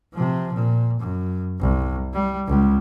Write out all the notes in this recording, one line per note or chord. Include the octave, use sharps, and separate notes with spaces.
C3 F3
A#2
F#2
C2
G3
C#2